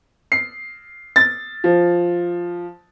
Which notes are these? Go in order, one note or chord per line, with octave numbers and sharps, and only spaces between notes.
C7
A6
F3